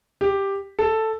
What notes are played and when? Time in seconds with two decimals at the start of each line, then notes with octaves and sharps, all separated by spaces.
0.21 G4
0.79 A4